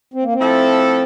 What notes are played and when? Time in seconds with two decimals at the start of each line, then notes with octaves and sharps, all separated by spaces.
0.14 C4
0.23 A#3
0.33 C4
0.39 F3 A3 E4 A4